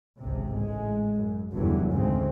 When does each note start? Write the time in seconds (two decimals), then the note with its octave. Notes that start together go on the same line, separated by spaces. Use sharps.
0.21 G#1 C#2 G#2 C3
0.58 A1 G#3
1.15 F#2
1.53 F1 E2 G2 D3 E3 F#3
1.92 D2 G#2 C#3 C4